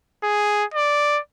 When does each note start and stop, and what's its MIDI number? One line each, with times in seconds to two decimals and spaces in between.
0.23 0.64 68
0.74 1.19 74